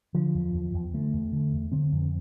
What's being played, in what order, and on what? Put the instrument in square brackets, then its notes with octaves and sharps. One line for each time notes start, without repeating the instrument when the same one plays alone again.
[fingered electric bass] D3 F3
E2
E2
E2
D3 A3
E2
D3
E2
D3 C4
F2